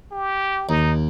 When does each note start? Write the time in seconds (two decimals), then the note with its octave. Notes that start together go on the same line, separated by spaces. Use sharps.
0.12 G4
0.69 D#2 D#4